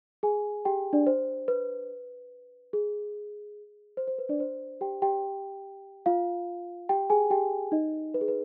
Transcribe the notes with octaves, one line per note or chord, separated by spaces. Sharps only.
G#4 G#5
G4 G5
D4 D5
C5
B4
G#4
C5
C5
B4
D4 D5
C5
G4 G5
G4 G5
F4 F5
G4 G5
G#4 G#5
G4 G5
D#4 D#5
B4
G#4
B4